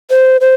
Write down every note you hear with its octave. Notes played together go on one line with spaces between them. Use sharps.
C5
C5